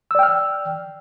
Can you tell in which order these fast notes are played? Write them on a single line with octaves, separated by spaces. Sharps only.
E6 D5 G5 F6